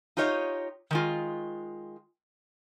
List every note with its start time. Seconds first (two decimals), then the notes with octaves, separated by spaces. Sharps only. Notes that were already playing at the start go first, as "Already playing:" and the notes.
0.17 D#4 F4 G4 C#5 D#5
0.91 D#3 G#3 F4